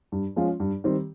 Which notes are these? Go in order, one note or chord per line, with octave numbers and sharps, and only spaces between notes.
G2
F3 G#3 C#4 F4
G2
D#3 G3 C4 G4